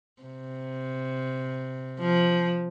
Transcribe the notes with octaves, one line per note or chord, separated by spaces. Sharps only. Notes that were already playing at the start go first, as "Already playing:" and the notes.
C3
F3